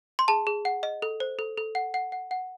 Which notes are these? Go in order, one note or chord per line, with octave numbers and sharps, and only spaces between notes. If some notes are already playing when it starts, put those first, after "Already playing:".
C6
G#4 A5
G#4
F#5
D#5
A4
C5
A4
A4
F#5
F#5
F#5
F#5